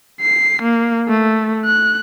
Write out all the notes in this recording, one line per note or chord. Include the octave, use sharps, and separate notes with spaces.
C7
A#3
A3
F#6